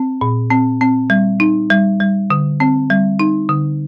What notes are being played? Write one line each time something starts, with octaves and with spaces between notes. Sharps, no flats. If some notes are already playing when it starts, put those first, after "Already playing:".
Already playing: C4
A#2
C4
C4
G3
D#4
G3
G3
D3
C4
G3
D#4
D3